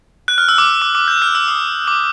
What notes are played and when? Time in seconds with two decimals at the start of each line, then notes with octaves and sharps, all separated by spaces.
0.28 F#6
0.38 F6
0.49 E6
0.58 D6
0.82 D6
0.95 D6
1.08 G6
1.22 F6
1.35 E6
1.48 D#6
1.87 D6